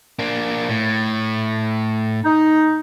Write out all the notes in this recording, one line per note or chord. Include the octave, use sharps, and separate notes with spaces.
A#3 D4
A2
D#4